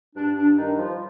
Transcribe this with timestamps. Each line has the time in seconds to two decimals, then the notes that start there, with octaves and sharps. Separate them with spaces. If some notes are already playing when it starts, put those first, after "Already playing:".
0.15 G2 D4
0.36 D4
0.57 D#3 G3 D#4
0.77 F3 F4